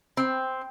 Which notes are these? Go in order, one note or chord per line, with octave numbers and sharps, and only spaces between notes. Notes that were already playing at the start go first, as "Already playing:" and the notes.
C4